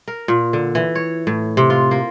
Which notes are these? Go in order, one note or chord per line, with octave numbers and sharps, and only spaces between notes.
A#4
A#2
D3
E3
C#5
A2
C3
F4
A#3